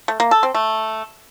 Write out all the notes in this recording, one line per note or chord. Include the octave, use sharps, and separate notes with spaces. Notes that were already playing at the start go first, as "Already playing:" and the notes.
A3
A#3
A4
C4
A3